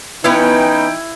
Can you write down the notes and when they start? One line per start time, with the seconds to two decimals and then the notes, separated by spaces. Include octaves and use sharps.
0.24 E3 B3 C#4 D#4 E4 B4 G5